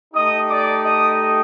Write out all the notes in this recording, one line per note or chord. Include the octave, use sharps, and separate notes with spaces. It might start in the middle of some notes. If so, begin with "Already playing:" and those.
A3 D#4 G4 D#5 D#6
D5 D6
D#5 D#6